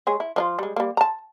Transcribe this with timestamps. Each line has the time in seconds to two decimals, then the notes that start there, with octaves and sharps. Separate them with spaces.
0.07 G#3 G#4 C#5
0.20 E4
0.36 F3 D#4 F4
0.59 G3 G#3
0.76 G3 A#3
0.97 A5 A#5